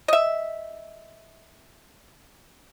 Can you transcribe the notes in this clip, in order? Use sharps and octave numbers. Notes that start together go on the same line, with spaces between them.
D#5 E5